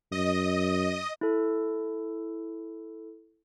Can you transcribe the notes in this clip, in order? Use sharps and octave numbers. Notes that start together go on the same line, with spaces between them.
F#2 D#5 D#6
E4 A4